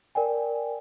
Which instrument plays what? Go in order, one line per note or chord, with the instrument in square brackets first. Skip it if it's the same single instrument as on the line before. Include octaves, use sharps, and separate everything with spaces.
[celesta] A#4 D5 G5 G#5